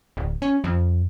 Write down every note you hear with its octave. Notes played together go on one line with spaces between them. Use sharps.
D1
C#4
F2